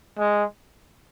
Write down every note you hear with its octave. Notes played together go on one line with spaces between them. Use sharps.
G#3